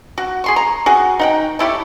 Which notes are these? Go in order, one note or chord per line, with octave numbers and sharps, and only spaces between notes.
F#4
G#4 C6 C#6
A#5
F#4 G#4
D#4 F#5 G5
A3 E4 G4 C#5